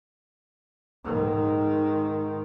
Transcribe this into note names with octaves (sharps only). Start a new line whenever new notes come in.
G#2 D#3